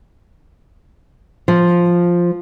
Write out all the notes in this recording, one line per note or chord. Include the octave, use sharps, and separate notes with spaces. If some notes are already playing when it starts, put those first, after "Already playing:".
F3